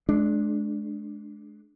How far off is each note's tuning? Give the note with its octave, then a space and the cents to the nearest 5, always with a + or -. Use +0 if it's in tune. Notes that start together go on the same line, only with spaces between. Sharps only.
G#3 +35 D4 +0